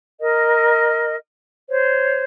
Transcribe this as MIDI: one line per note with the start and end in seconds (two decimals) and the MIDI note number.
0.20 1.16 70
0.20 1.16 75
1.69 2.25 72
1.69 2.25 73